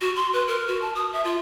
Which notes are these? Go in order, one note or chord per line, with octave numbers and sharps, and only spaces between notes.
F#4
C6
B4
A#4
F#4
A5
D#6
E5
F4